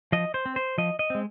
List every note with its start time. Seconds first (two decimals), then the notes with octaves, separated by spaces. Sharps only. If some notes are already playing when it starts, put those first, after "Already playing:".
0.12 F3 D#5
0.34 C5
0.46 C4
0.56 C5
0.78 F3 D#5
0.99 D#5
1.10 G#3 C4